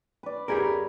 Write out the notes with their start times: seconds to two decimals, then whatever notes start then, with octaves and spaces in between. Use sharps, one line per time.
0.23 B4 D5
0.48 F#2 G4 G#4 A#4 A#5 B5